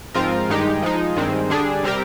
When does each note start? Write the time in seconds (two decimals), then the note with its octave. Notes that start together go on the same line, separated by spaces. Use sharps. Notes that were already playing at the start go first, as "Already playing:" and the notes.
0.14 G#2 F3 C4 F4 A#4
0.49 G2 D#3 G#3 D#4 G4
0.82 F3 G#3 D#4
1.16 G2 D#3 G#3 C4
1.50 D3 G3 D4 G#4
1.83 C3 G3 C4 G4 A#4